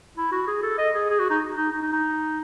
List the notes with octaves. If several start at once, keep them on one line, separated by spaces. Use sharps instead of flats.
E4
F#4
G#4
A4
D#5
G#4
G#4
F#4
D#4
D#4
D#4
D#4
D#4